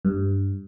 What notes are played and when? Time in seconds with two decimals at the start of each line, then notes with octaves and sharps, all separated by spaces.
0.05 G2